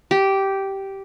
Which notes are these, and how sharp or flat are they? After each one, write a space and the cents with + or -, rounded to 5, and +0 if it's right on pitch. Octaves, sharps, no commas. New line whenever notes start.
G4 -10